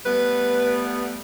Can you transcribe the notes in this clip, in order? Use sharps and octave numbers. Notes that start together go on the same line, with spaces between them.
G3 A3 B3 B4